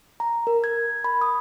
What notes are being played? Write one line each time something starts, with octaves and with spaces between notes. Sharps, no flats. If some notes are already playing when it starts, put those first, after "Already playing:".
A#5
A#4
G#6
B5
D#6